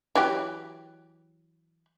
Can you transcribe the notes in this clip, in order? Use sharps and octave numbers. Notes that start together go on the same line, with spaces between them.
E3 F#3 G4